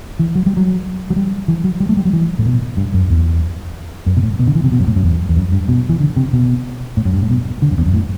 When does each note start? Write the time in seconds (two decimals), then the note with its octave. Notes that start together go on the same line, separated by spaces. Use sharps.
0.19 E3
0.35 F#3
0.46 G3
0.57 F#3
1.10 F#3
1.16 G3
1.48 E3
1.64 F#3
1.80 G3
1.89 A3
1.97 G3
2.05 F#3
2.13 E3
2.39 A2
2.45 B2
2.77 G2
2.94 F#2
3.10 E2
4.06 F#2
4.17 B2
4.23 A2
4.40 B2
4.47 D3
4.55 E3
4.64 C3
4.72 B2
4.80 F#2
4.87 A2
4.96 F#2
5.03 E2
5.29 E2
5.37 F#2
5.52 G2
5.68 B2
5.89 E3
6.00 D3
6.16 C3
6.33 B2
6.97 A2
7.05 F#2
7.13 G2
7.22 A2
7.30 B2
7.62 D3
7.71 F#2
7.78 E2
7.86 F#2
7.94 A2